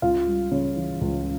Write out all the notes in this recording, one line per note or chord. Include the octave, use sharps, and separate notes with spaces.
C#2 F4 F5
G3
C#3
E3
C#2